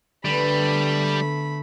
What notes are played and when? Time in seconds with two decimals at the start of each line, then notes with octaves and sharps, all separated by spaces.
0.25 D3 G3 A3 B3 B5